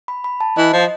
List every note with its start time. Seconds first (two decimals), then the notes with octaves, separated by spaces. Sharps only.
0.08 B5
0.24 B5
0.40 A5
0.57 E3 D#5
0.73 F3